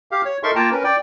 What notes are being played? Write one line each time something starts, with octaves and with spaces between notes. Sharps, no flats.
G4 F5
C#5
D#4 A4 A#4 E5 C6 C#6
A#3 F4 G5 A5 A#5
C#4 A#4 B4
D5 G5